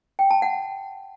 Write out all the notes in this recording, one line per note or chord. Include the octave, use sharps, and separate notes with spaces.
G5
A5
F#5